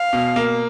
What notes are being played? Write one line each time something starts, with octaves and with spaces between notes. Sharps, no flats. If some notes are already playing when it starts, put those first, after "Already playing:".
Already playing: F5
B2
A#3